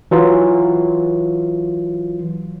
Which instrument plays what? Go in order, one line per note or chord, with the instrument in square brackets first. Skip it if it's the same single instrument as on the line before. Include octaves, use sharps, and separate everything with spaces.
[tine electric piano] E3 F#3 F4